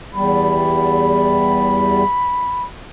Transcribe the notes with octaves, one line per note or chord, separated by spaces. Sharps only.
E2 G3 B5